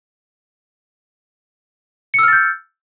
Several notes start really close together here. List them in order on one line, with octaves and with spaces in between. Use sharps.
C#7 E6 F6 A6 G6